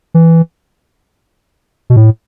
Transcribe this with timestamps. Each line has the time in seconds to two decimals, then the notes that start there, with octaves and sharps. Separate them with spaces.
0.14 E3
1.90 B2
1.96 A2